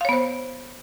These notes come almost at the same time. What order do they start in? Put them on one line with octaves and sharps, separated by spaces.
F5 C#5 B3 C5